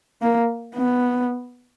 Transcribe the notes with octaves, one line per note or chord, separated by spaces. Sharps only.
A#3
B3